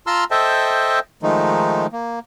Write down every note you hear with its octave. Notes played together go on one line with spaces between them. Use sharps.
F4 A5 A#5 C6 E6 F6
A4 C5 D#5 E5 G5 A5
D#3 F3 G#3 A3 D#4
A#3